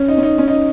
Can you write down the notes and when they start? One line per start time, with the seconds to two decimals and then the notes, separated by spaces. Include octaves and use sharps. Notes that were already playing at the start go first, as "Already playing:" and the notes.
Already playing: C#4
0.08 D#4
0.18 C#4
0.23 D#4
0.38 C#4
0.48 D#4